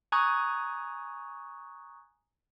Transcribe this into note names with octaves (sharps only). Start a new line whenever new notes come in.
G#5 A#5 C#6 D#6 F#6 G#6